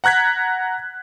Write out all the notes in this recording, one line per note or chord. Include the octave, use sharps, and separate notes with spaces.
F#5 A#5 F#6 G#6 B6